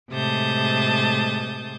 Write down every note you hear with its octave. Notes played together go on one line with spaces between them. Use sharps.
A2 C3 G#3 A5 D#6 G6